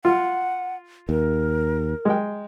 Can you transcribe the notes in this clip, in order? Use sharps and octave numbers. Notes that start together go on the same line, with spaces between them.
F4 F#5
D#2 A#4
G#3 G5